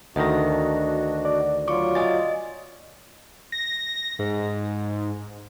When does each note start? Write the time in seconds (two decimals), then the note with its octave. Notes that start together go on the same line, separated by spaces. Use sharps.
0.16 D2 D#3 D4 F#4 D#5 A#6
1.25 D5
1.68 F#3 F4 C#6 D6
1.95 D#5 G#5 A6
3.52 A#6
4.19 G#2